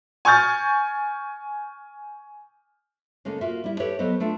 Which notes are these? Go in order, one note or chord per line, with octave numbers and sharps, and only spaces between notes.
G#5 C#6 F6 G6 A6
C#3 G#3 A#3 C#4 A4
A#3 F4 F#4 E5
G3 E4
G4 A4 B4 C#5 F#5
F#3 B3 A4 C5 D#5
A3 D4 F4